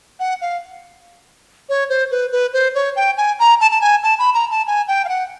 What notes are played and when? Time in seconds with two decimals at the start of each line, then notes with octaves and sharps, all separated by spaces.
0.20 F#5
0.41 F5
1.69 C#5
1.89 C5
2.11 B4
2.32 B4
2.53 C5
2.75 C#5
2.96 G5
3.17 G#5
3.39 A#5
3.61 A5
3.71 A5
3.81 G#5
4.03 A5
4.19 B5
4.34 A#5
4.51 A5
4.67 G#5
4.88 G5
5.05 F5
5.09 F#5